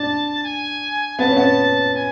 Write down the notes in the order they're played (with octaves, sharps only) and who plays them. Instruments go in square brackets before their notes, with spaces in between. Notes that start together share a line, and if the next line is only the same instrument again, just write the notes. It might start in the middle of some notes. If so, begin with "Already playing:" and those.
Already playing: [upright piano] D4 [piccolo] A5
[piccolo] G#5
[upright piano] B3 [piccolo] A5
[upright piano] C#4
B3
[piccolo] G#5